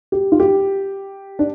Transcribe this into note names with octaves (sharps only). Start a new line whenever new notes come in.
G4
F4
G4
D4